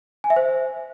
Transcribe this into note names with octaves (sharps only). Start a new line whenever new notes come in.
G#5
E5
C5